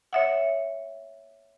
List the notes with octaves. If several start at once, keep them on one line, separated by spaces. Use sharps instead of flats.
C#5 E5 F#5